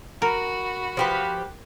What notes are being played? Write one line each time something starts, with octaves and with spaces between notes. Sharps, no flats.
F#4 A#4 B5
F3 G4 B4